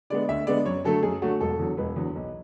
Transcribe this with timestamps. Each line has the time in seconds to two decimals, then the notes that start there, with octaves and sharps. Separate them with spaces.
0.10 D3 G#3 B3 D5
0.28 D2 E5
0.47 D3 G#3 B3 D5
0.65 F#2 C#5
0.84 D3 F#3 A3 A4
1.03 F#2 G#4
1.22 D3 F#3 A3 F#4
1.40 E1 A4
1.59 E2 D3 F#3
1.77 E1 B4
1.96 E2 D3 F#3
2.16 B1